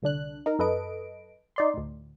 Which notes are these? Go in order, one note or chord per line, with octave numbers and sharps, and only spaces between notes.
C2 D3 D4 F#6
D#4 A#4
F#2 A4 B4 D#5 D7
D#4 D5 C6
D2 A2